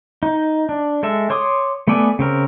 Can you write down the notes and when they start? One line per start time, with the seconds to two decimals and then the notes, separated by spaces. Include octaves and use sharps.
0.23 D#4
0.69 D4
1.03 G#3 A4 E5
1.30 C#5 C6 D6 D#6
1.88 A3 B3 A4 D5 G#5
2.19 C#3 C4 A#4